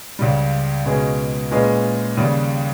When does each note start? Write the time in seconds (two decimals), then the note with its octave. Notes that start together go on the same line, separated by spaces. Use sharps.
0.19 C#2 C#3 G3
0.85 C#2 B2 G#3 C#4 G#4
1.51 A#2 G#3 C#4 G#4 B4
2.17 D#2 C#3 G3